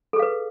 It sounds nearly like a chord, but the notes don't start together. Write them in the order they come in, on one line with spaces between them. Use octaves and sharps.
A4 G#4 F5 B4